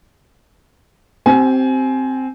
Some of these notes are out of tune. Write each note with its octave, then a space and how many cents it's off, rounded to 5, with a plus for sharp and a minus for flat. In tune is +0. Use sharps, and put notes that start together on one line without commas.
C4 +0 G4 -30 G#5 +25